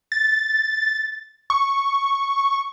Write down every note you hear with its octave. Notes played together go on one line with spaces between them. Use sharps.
A6
C#6